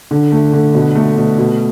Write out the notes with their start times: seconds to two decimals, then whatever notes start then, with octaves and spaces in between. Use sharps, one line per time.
0.11 D3
0.32 A3
0.53 D3
0.75 B2
0.95 A3
1.17 B2
1.38 B2